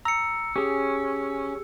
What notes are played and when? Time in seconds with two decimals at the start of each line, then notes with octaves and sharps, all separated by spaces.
0.05 A#5 E6 C#7
0.56 C#4 G4 G#4